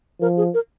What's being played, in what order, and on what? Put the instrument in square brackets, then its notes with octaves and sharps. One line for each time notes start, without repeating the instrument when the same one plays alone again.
[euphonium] F3 [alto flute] A#4
[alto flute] G#4
A#4